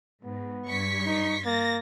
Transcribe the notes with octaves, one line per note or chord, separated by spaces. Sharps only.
G#2 B3
G2 C#6 B6
D#4
A#3 A6 A#6